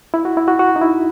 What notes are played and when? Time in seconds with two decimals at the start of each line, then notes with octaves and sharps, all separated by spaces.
0.14 E4
0.25 F#4
0.37 E4
0.48 F#4
0.59 F#4
0.76 D#4
0.81 E4